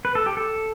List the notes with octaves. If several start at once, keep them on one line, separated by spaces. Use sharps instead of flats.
B4
A4
G4
A4